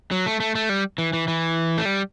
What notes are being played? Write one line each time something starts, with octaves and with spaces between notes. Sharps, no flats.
F#3
A3
A3
A3
G3
E3
E3
E3
A3
G3